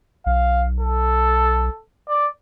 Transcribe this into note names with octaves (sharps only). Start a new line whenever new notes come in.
B1 F5
A4
D5